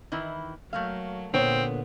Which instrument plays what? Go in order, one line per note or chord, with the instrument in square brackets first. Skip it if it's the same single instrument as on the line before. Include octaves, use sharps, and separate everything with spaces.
[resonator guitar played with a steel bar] D#3 E3 E4
[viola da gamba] F#3 [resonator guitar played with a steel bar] A3 A#3 F5
[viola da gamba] A#2 [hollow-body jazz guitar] D3 B3 C#5 [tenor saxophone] C4